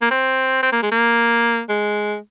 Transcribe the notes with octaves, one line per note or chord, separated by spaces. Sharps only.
A#3
C4
C4
A#3
G#3
A#3
G#3